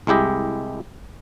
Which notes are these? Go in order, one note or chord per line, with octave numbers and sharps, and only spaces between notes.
C2 G#3 E4 G4 D#5